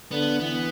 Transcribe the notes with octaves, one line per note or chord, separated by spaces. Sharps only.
D3 B3
E3 B3